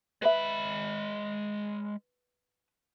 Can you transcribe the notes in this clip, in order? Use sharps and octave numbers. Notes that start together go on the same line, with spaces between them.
G#3 B4 E5 B5